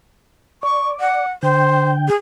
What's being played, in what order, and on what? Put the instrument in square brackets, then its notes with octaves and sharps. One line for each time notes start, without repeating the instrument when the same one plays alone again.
[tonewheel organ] D5 [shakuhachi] C#6
[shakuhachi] F#5
[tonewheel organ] D3 G5 [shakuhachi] C5
[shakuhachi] G#4